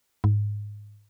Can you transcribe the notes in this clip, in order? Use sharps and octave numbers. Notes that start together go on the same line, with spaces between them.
G#2